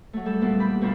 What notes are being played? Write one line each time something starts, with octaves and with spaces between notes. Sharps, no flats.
F#3 A3
G3 A4
A#2 E3 A#3 B3
G4 B5
D2 B2 G3 D4 F4 A4